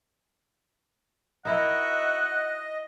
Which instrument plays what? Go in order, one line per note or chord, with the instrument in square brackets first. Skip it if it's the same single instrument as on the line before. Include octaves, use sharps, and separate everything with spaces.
[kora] D#4 E4 A#4 [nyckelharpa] F#4 E5 [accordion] D#5 [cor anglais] F#5